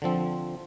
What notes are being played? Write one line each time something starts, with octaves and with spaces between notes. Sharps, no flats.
D3 F3 C4